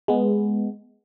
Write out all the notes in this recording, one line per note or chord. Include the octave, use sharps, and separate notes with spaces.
G#3 B3